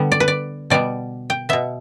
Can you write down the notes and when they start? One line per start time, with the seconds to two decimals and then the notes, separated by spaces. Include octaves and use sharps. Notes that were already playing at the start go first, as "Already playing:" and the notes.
Already playing: D3 G3 B3
0.12 D5
0.20 B4
0.28 D5
0.70 B2 G3 B3 D5
1.30 G5
1.49 B2 B3 E5